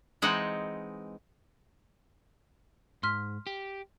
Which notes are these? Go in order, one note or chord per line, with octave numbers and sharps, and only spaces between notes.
E3 G#3 C4 D#4 F#5
G#2 C6 F6 B6
G4